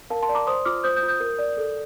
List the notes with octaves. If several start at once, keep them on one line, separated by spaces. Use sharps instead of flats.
A#4 F5 A5
A5 C6
D5
A#5 D6
C5 C6 D#6
F4 D6 F6
C5 D#6 G6
D#6 G6
F4
D#6 G6
A#4
D5
A4